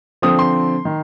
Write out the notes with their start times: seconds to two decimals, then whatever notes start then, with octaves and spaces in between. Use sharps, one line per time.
0.22 D3 F3 C4 D#6
0.39 C6
0.85 D#3